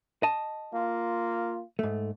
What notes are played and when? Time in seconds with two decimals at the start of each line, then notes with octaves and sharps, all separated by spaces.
0.23 D#5 A5
0.73 A#3 F4
1.79 G#2 A3